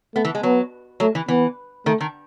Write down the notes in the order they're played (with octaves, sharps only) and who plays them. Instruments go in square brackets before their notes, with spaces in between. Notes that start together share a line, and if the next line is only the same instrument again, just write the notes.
[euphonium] A3 [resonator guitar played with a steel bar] B3
[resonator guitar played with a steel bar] E3
G#3
[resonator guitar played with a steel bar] F#3 [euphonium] B3
[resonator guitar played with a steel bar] F#3 [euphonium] A3
[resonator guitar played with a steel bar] E3
[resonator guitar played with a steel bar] E3 [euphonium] B3
[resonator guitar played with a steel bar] D#3 [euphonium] A3
[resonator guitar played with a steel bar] D#3